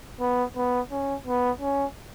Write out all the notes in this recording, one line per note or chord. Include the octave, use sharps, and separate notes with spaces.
B3
B3
C#4
B3
C#4